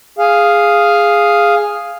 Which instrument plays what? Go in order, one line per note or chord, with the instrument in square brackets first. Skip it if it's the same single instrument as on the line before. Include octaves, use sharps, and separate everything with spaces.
[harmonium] G#4 F5